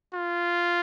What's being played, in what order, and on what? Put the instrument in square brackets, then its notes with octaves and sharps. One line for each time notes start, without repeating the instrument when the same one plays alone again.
[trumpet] F4